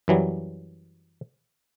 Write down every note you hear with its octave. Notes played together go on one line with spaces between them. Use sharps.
F#2 E3 F#3 G3